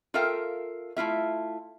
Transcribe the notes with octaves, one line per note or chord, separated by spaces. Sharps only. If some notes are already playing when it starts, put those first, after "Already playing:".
F4 A4 A#4 E5 F5 G5
A3 E4 F4 E5